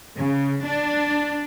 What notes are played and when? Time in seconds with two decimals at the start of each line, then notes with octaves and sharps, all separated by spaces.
0.16 C#3
0.66 D4